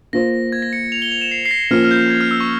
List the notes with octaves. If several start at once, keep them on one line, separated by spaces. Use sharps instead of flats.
A#3 F4 C5 A#6
G#6
A#6
C#7
F7
G7
F7
E7
C7
C7
A#6
F3 A#3 C#4 F4 C5 F6
F6
G6
G#6
F6
E6
C#6